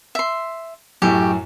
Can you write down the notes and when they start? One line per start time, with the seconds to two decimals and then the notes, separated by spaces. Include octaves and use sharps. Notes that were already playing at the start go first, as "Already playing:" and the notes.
0.15 E5 C6
1.02 F#2 A2 G4